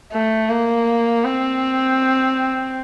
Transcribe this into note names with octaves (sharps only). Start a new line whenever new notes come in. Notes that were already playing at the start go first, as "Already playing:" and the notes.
A3
A#3
C4